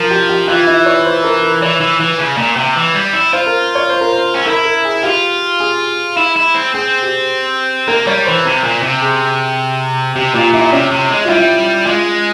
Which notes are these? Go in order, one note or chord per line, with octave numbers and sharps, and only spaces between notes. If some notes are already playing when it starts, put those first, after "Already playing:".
Already playing: F3 A#4
G4
G4
E3 F4
E4
C#5
C5
A#4
A#4
E3 C#5
E3
E3
C#3
A#2
C3
E3
G3
E4
F4 C5
A#4
C#5
C5
A#4
C5
C#4
E4 A#4
A#4
G#4
F4 G4
G#4
E4
E4
C4
C4 G#4
G4
A#3 A#4
G3 C#5
E3 C5
C3
A#2
C3
G#4
C3 G4
A#2 F4
A#2 E4
C3 C#4
C3
G#3
F4
G3 E4
G#3 F4